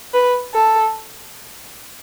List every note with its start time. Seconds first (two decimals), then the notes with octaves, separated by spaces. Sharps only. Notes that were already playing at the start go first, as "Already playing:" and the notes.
0.14 B4
0.55 A4